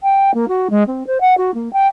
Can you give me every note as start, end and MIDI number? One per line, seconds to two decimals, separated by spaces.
0.03 0.34 79
0.34 0.45 58
0.48 0.68 66
0.70 0.83 56
0.87 1.06 60
1.07 1.18 72
1.21 1.36 78
1.38 1.54 66
1.54 1.71 58
1.73 1.87 79